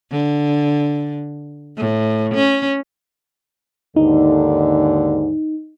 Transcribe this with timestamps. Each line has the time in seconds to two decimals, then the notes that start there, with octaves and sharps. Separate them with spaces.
0.11 D3
1.77 A2
2.34 C#4
3.96 D#2 G#2 D3 D#4